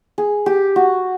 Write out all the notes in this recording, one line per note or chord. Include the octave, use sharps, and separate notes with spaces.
G#4
G4
F#4